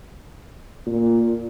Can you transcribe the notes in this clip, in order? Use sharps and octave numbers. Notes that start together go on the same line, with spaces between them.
A#2